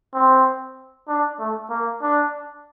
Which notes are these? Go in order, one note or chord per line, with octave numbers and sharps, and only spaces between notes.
C4
D4
A3
A#3
D4